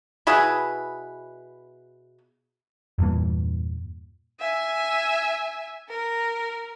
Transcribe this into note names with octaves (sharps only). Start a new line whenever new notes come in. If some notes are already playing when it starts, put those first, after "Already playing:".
B2 E4 G#4 B4
E2 G2 A#2 E3
E5 G#5
A#4